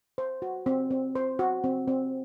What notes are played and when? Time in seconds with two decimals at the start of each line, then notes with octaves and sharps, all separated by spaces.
0.18 C5
0.42 F#4
0.66 C4
0.91 C4
1.15 C5
1.39 F#4
1.64 C4
1.88 C4